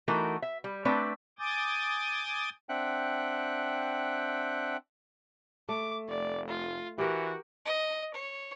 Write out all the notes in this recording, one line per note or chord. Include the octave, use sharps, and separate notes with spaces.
E3 A3 D#4 F#4 A#4
E5
G3
A3 C4 D4 B4 D5
G#5 D6 D#6 G6 A6
C4 D4 E5 F#5 G5 F#6
A3 D6
F1 D5
F4
E3 F#4 G4 A#4
D#5
C#5